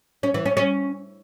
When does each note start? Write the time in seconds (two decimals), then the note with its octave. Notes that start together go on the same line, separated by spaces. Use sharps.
0.23 C#4
0.34 E3
0.46 C#4
0.57 C#4